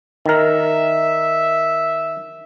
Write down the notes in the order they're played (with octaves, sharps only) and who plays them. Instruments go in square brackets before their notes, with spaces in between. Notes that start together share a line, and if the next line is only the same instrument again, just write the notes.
[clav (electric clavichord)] D#3 A#4 [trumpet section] E5